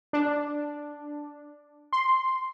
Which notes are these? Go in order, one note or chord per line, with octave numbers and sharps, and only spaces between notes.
D4
C6